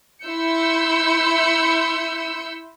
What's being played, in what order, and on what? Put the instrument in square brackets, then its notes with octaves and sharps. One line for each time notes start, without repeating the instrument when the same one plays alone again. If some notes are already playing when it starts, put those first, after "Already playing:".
[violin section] E4 C6 E6 G6 C#7